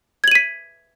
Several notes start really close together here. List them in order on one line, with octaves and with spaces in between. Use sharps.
G#6 F#7 D#7 B6